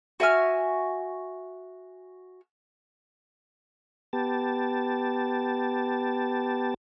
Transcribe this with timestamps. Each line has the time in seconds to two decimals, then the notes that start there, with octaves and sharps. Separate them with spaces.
0.20 F#4 E5 G#5 F6
4.13 B3 G4 A5